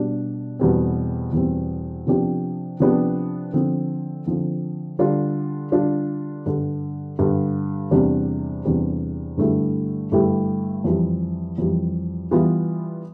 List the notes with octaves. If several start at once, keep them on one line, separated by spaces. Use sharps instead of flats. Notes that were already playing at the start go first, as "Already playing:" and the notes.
Already playing: B2 G3 D4
E2 B2 G3 C4
E2 B2 G3 C4
C3 F3 B3 D4 G4
C3 F3 B3 D4 G4
D3 F3 C4
D3 F3 C4
D3 G3 D4 F4
D3 G3 D4 F4
G2 D3 G3
G2 D3 G3
E2 C3 G3 D4
E2 C3 G3 D4
G2 D3 A3 E4 G4
G2 D3 A3 E4 G4
F2 E3 G3
F2 E3 G3
E3 G3 B3 F4